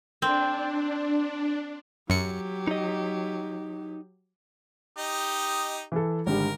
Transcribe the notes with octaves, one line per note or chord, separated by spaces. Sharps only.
C4 D4
F#2 F#3 G4 C#7
D#4 D#5
D#4 G4 D#5
E3 A4
G#1 D3 G3 A#4